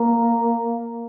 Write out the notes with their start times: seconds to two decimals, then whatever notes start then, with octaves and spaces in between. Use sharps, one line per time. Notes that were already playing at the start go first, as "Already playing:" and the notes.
Already playing: A#3